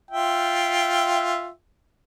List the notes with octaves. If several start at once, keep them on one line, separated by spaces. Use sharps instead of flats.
F4 E5 G5